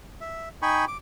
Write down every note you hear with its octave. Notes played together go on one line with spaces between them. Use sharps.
E5
D#4 G5 G#5 B5 C#6
D6